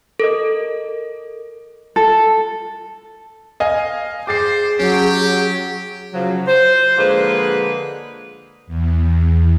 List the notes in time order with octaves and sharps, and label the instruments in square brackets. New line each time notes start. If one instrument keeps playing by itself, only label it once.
[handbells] A4 A#4 D#5
[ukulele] A4
[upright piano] D#5 F5 G#5
[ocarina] G#4 [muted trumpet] C5 [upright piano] D6 A6 C7
[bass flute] F#3 [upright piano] C#4 [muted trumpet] G4
[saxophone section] C#3 F3 F#3
C5
D3 F3 G#3 A#3 G#4 B4
[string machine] E2